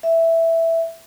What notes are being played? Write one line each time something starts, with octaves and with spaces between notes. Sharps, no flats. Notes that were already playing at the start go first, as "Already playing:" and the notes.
E5